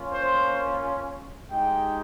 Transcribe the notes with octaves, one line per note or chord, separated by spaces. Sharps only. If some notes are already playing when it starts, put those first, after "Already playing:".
Already playing: A#3 C#4 F4
C5
G#3 D#4 G4 G5